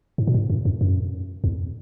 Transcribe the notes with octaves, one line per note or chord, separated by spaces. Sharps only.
G#2
A#2
G#2
F#2
F#2
F#2
E2